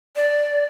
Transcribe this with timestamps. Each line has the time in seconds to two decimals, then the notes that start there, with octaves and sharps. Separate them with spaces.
0.16 D5